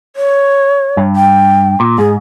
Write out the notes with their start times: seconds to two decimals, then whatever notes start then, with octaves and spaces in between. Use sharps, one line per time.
0.16 C#5
0.97 G2
1.16 G5
1.80 A#2
1.98 G#2 G#4